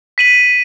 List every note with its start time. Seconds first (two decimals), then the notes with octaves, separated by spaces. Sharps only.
0.18 B6 D#7 F#7